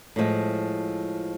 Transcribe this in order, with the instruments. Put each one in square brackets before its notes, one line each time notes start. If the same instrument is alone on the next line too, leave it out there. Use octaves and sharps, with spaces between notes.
[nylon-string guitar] A2 F3 G#3